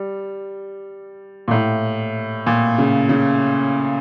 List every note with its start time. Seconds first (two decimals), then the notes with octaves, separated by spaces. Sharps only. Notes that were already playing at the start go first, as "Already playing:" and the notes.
Already playing: G3
1.48 A#2
1.51 A2
2.47 A#2
2.78 C#3
3.09 C#3